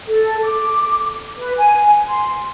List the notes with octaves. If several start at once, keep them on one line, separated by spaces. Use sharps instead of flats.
A4
D6
B4
G#5
C6